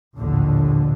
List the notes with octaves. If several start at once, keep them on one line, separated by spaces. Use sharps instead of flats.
A#1 D#2 A2 D3